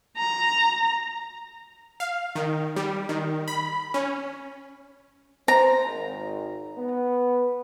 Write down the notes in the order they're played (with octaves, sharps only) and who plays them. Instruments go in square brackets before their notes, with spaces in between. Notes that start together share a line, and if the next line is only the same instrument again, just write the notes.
[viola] A#5
[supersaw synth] F5
D#3
G3
D#3
B5
C#4
[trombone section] C5 [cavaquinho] A#5
[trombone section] G#1
B3